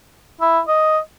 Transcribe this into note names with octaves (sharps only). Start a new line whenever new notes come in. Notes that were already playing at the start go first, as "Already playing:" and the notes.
E4
D#5